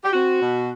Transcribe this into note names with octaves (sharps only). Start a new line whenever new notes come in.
G4
C4 F#4
B2